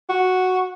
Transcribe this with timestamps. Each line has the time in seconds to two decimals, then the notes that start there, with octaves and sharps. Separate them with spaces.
0.09 F#4